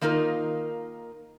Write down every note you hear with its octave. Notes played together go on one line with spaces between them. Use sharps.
D#3 A#3 D#4 F4 A#4